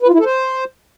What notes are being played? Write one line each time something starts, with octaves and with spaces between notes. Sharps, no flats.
B4
F4
E4
A4
C5